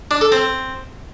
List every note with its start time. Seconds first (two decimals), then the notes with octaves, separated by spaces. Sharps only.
0.11 D4
0.21 A4
0.32 C4